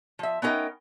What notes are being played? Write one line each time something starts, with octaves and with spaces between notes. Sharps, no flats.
F3 E5
B3 C#4 D#4 A#4 E5 G5